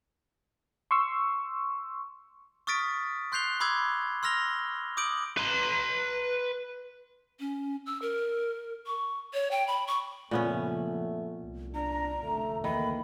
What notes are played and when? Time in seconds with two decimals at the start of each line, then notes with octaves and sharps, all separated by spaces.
0.91 C6 C#6 E6
2.67 C#6 D#6 F6 A6 B6 D7
3.32 C6 F#6 G6 C7 F7 G7
3.60 B5 C6 D6 E6 G6 G#6
4.23 C6 E6 F6 A#6 F7 G7
4.97 D6 D#6 G6 D7 F#7
5.38 B4 C6
7.40 C#4
7.86 E6
8.02 A#4
8.87 C#6
9.34 C#5
9.51 G5
9.67 B5
9.87 C#6
10.31 F#2 A#2 C#3 F3 A3 B3 C#4
11.40 C2
11.74 D4 A#5
12.24 F1 F2 D3 A3
12.64 D2 D#3 E3 A#3 B5